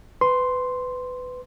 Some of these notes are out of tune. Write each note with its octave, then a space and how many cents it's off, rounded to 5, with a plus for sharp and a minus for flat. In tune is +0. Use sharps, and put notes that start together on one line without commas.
B4 +25 C6 +0